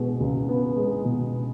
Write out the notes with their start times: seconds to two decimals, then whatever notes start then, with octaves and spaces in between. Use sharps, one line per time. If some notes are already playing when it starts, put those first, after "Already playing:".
Already playing: B2 G#3
0.20 C#2
0.49 B3
0.77 G#3
1.05 B2